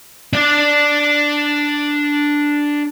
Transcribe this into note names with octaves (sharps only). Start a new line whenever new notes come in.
D4 D5